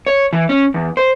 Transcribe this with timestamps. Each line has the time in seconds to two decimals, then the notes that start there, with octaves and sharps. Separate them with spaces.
0.07 C#5
0.33 E3
0.49 C#4
0.74 E2
0.97 C5